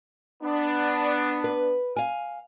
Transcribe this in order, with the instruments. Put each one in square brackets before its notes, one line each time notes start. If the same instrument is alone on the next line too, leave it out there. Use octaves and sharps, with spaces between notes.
[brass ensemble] B3 D4
[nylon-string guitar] B4
F5 G#5